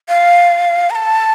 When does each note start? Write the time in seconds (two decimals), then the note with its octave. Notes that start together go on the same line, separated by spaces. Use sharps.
0.09 F5
0.90 A#5
0.95 A5